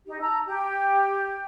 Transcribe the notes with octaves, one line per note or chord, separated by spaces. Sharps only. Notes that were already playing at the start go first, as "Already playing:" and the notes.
D#4 G4
A5 A#5 E6
G4 G5